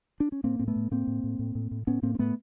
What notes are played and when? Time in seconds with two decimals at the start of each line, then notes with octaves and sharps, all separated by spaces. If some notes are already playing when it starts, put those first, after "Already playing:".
0.20 D4
0.32 C#4
0.44 A2 A#3 C4
0.59 A2 C4
0.68 A3 B3
0.76 A2
0.91 A2 A#3 C4
1.07 A2
1.24 A2
1.39 A2
1.55 A2
1.71 A2
1.87 A2 B3 C#4
2.03 A2 A#3 C4
2.15 C4
2.19 A2 A3 B3